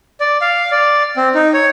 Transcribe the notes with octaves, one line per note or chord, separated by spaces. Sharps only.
D5
F5
D5
C4
D#4
C#5